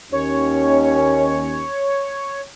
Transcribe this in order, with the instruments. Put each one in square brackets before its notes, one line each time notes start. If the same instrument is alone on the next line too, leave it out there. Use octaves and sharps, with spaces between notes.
[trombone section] D#2 C#4 [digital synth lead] C#5